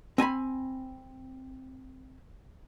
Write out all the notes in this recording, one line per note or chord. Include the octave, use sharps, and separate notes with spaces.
C4 G#5 A#5 B5